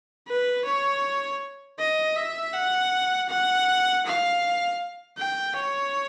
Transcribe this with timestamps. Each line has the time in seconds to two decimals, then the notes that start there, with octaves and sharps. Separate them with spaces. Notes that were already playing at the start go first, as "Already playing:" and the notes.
0.28 B4
0.65 C#5
1.79 D#5
2.16 E5
2.53 F#5
3.29 F#5
4.05 F5
5.18 G5
5.56 C#5